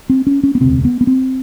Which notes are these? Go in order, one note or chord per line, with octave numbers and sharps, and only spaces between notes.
C4
C#4
C#4
B3
E1 D2 C3 C4
B3
B3
C4